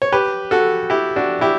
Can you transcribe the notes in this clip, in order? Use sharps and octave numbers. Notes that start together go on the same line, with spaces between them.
C#5
G4 B4
F#4 A4
E4 G4
D4 F#4
E4 G4